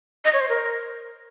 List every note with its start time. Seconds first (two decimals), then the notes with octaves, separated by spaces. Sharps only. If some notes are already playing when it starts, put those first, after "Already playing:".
0.25 D#5
0.33 C#5
0.41 C5
0.49 A#4